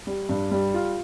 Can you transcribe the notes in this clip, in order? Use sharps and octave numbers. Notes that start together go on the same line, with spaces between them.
G3
G2
G3
F4